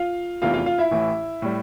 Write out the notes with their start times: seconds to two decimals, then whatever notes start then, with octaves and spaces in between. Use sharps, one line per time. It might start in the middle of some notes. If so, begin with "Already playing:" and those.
Already playing: F4 F5
0.42 F1 E2 C3 E3 A3 F4 F5
0.54 F4 F5
0.66 F4 F5
0.78 E4 E5
0.91 A1 A2 E3
1.42 A2 G3